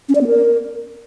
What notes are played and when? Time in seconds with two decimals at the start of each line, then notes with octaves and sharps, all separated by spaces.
0.09 C#4
0.15 D5
0.21 B3
0.27 A#4